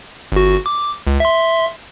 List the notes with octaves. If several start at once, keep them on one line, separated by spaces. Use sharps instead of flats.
G1 F#4
D6
C#2
E5 C6